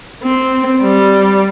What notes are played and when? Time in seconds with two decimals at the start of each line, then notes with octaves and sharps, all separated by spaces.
0.23 C4
0.82 G3